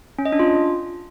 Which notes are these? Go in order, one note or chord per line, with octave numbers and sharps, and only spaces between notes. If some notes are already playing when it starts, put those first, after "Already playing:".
C#4
D#5
D4
F4